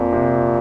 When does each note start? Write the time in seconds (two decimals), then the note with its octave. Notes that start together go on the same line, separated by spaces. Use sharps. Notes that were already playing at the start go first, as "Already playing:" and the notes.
Already playing: F2 A#2
0.13 C3